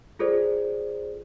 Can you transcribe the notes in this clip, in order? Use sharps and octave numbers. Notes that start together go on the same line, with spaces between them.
F4 G#4 A4 C5 D5